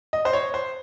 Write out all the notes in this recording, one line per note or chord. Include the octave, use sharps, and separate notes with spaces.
D#5
C5
C#5
C5